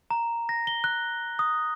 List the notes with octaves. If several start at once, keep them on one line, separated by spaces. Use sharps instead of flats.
A#5
A#6
G7
F#6
D#6